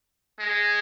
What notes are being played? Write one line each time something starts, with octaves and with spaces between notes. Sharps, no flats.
G#3